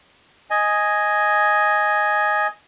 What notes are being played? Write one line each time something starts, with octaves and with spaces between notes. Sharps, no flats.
D#5 G#5